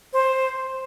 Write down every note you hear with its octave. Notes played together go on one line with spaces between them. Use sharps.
C5